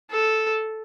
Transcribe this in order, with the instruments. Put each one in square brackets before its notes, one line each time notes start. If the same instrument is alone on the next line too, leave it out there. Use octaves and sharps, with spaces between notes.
[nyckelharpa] A4